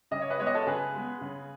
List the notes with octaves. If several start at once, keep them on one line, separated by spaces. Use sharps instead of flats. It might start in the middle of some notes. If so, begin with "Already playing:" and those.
C#3 D#5
C#5
B4 D#5
G#3 B3 C#5
D#5
A4 C#5
C#3 G#4 B4
G#3 B3
C#3